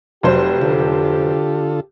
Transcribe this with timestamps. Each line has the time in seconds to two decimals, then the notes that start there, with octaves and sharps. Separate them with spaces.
0.23 F1 F#3 G4 C5
0.61 D3 F4 A4